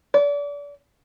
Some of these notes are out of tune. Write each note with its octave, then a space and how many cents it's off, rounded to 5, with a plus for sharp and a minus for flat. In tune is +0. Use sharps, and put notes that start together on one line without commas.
D5 -35